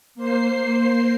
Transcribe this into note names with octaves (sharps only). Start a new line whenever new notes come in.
A#3 C5 C7